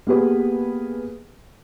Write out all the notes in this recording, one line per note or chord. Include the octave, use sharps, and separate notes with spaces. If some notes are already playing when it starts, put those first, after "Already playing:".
A#3 B3 G4 G#4 B4